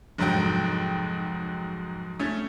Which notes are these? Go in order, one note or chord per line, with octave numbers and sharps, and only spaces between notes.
F1 G#2 F#3 F#4 G5
A3 C#4